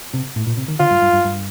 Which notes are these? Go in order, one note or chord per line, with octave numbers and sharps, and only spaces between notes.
C3
A2
A#2
C3
D#3
D3 F4
G2
G2
G2
G2